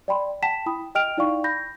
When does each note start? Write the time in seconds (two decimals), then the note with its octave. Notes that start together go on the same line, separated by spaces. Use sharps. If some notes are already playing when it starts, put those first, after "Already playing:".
0.08 D5 G5 B5 C6
0.42 F#5 G5 A5 B6 E7
0.66 E4 G5 B5 D#6
0.95 D#5 G5 F6 D7 F7
1.17 D#4 E4 D5 F5 G5 C#6
1.44 B5 G6 A#6